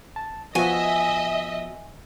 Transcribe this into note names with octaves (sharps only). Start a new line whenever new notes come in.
A5
F3 B3 F#4 D#5 E5 G#5